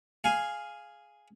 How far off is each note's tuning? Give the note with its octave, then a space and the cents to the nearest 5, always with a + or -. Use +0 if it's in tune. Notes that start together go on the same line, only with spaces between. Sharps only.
G#4 +0 F5 +0 G#5 +0